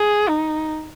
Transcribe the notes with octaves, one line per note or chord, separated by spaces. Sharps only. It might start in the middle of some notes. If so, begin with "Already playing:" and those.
Already playing: G#4
D#4